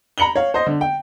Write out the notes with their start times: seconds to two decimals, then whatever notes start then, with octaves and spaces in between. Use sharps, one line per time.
0.18 A#5 B5 C#7 F#7 G7
0.36 C#5 F5
0.54 C5 D#5
0.67 D3
0.81 G5